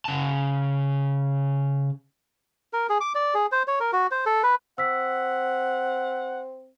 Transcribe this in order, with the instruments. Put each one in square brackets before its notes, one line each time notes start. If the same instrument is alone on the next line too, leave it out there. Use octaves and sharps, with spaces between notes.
[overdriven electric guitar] C#3 A5
[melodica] A#4
G#4
D6
D5
G#4
C5
C#5
A#4
F#4
C5
A4
B4
[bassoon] C4 [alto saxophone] F#5 [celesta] E6 B6